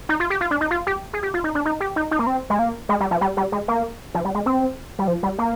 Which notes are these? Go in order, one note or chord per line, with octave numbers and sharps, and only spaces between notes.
D#4
F4
G4
F4
D4
D#4
F4
G4
G#4
G4
F4
D#4
D4
D#4
G4
D#4
D#4
A#3
C4
G#3
A#3
G#3
G3
F3
G3
G3
G#3
A#3
F3
G3
G#3
C4
G3
F3
G3
A#3